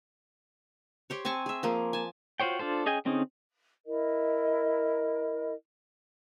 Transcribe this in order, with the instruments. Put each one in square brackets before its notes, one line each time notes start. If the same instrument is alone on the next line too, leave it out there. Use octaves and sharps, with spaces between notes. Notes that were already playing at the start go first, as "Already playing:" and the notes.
[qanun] G4 C5 C#5
C4 G#5 A5 C#6
G#4 E5
F3 A#3 G#4
G#5 A5
[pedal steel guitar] F4 F#4 C5 C#5 G5
D4 F4 A4 C5
C#4 G#4 D#5 G5 G#5
D3 C4 C#4 D#4 G#4
[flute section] E4 A#4 D#5